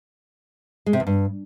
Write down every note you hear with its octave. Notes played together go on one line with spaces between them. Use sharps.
G#3
C3
E2
G2